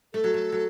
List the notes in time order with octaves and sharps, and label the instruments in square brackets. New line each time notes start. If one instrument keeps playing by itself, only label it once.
[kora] A3 [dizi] A4
[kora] F#3
A3
F#3